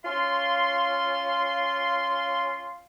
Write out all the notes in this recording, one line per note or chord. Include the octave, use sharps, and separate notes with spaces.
C#4 F4 F5 C6